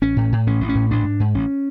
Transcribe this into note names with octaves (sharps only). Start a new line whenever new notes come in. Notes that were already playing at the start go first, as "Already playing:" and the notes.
A1 C#4
A2
A2
A1 C#4
A1
C#4
A2
A1 D4
G#2
G#2
A1 C#4